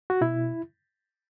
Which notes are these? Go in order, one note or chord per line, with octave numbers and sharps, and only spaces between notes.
F#4
B2 E4